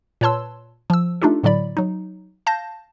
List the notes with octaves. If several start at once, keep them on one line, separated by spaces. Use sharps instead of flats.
A#2 B4 C#5 A5 C6 E6
F3 E6
A3 D4 D#4 F4 G4 A4
A2 D3 F#3 D5 B5
F#3 D#4
F5 A5 G6 A#6